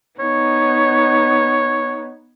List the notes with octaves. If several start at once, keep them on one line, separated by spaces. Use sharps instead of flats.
B3 D#4 C#5